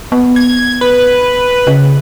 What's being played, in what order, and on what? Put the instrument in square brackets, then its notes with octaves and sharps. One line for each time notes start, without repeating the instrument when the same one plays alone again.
[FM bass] B3
[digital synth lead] G#6
B4
[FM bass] C#3